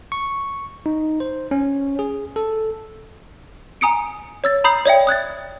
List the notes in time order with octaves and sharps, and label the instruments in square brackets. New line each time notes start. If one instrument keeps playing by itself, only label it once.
[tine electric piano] C#6
D#4
C5
C#4
G#4
A4
[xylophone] G#5 A#5 D#6 C#7 D7
C#5 E6 A6
A#5 B5 D#6 G6 C7
C#5 D5 E5 G5
D#6 F#6 G#6 A6